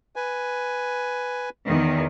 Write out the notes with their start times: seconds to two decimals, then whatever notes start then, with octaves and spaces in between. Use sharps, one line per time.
0.16 B4 G#5
1.65 E2 D#3